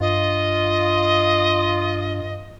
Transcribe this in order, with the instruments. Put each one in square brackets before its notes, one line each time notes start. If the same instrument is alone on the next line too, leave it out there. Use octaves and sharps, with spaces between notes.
[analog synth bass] G2 [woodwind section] F4 [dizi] D#5